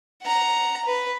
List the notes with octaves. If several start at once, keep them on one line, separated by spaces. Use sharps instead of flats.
F#5 A#5
B4